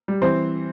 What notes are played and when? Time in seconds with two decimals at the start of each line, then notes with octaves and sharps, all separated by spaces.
0.08 G3
0.22 E3 C4 C5